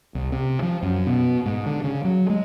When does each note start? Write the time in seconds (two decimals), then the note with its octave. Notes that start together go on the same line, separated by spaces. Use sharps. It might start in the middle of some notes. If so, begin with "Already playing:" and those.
0.15 C2
0.32 C3
0.62 F3
0.82 F#2
1.07 B2
1.46 G#2
1.66 D3
1.84 C#3
2.05 F#3
2.30 G#3